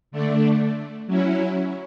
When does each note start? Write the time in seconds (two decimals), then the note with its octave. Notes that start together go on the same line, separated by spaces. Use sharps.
0.11 D3 A3 D4
1.07 F#3 C#4 E4